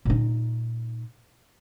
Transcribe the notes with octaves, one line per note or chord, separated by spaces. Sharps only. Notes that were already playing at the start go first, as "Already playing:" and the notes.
A#2 D#4